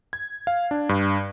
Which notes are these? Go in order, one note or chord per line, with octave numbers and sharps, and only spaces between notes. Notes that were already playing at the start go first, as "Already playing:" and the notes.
G#6
F5
D4
G2